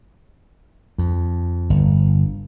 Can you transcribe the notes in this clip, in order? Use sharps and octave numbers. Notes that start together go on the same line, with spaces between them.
F2
G1